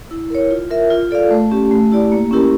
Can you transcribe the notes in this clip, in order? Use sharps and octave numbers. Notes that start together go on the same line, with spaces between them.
E4
A#4 C#5
F4
A#4 E5
F4
A4 D5 F5
A3
C#4 G4
A3
E4 G4 D5
A#3
C#4 E4 G4 A#4